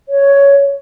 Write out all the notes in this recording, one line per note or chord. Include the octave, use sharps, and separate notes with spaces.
C#5